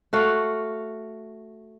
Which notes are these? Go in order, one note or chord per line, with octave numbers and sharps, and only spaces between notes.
A3 F#4 F5